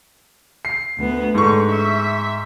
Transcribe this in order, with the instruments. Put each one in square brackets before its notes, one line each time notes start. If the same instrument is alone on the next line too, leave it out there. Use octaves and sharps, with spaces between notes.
[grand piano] C7
[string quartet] D2 B3
[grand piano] G#2 C#6 [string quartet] D3
[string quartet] E5